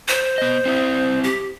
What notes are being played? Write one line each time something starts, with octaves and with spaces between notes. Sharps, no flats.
C5
B3 D#5
C4 E4 E5
G4